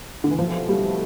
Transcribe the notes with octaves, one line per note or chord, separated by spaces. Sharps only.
D3
E3
C2 B2 F3 A3
G3